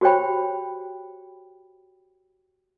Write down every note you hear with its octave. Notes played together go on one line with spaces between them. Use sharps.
F#4 G4 C5 C#5 G5 B5